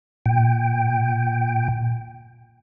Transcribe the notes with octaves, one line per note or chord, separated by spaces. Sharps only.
A#2 G5